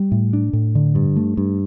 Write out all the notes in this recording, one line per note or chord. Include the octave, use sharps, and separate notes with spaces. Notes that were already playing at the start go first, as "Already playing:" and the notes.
Already playing: G3
A2
D4
A2
D3
G2
A3
G2